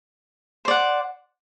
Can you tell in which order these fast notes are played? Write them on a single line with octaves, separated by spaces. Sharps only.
C5 D5 F#5